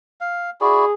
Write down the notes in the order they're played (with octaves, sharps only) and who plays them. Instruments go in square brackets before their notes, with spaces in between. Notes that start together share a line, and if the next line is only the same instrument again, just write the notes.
[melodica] F5
[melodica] E4 F#4 D5 [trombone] G#4